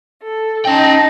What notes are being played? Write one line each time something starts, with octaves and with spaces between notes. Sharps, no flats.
A4
C#4 D#4 G5 A5